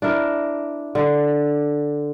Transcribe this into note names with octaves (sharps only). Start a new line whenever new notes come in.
D4 E4 A#4
D3